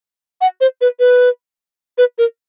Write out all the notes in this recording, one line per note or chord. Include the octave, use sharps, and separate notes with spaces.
F#5
C5
B4
B4
B4
A#4